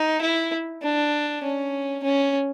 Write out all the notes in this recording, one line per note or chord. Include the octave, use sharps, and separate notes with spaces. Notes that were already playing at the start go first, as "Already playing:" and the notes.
Already playing: D#4
E4
D4
C#4
C#4